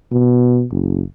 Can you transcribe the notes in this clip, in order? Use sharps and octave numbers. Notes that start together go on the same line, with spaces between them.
B2
F#1